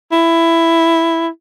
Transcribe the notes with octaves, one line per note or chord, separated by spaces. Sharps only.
E4